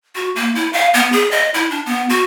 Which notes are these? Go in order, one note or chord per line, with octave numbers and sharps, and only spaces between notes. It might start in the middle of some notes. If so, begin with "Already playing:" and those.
F#4
A#3
E4
F5
B3
G#4
D#5
E4
D4
B3
F#4